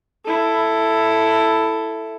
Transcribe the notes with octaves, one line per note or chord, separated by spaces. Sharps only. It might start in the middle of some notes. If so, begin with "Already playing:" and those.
E4 A4